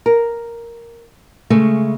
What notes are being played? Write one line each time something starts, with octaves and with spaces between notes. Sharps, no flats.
A#4
C#3 G#3 A3